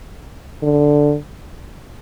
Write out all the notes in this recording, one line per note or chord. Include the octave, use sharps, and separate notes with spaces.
D3